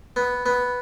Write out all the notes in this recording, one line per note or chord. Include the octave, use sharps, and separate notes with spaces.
B3
B3